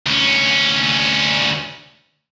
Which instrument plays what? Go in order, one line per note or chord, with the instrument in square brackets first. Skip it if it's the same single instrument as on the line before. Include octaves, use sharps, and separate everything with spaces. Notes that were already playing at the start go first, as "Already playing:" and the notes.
[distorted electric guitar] D2 C#4